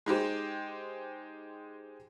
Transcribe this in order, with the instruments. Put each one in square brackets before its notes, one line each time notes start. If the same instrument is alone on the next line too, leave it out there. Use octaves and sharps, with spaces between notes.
[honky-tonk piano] G#3 D#4 G4 C5